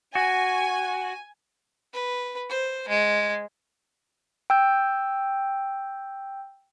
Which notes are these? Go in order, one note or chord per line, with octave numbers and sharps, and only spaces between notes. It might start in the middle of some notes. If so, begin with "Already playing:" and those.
F#4 G#5
B4
C5
G#3
G5 E6 G6